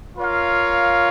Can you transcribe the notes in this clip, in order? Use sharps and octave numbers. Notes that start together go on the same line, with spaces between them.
F4 A#4 C#5 F5